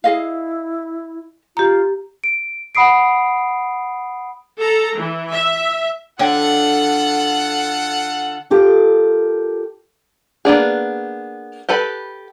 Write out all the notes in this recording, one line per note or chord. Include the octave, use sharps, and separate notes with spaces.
E4 G#4 D#5 F5
F4 G4 A#5
D7
F#5 B5 D#6 C7 D7
A4 A#5
E3
E5
D3 F4 A4 C#5 F#5 G5
F4 G4 A4 A#4
A#3 B3 D4 G#4
G4 A4 B4 B5